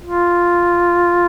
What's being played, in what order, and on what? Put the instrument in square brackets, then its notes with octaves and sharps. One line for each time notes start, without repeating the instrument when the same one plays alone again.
[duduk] F4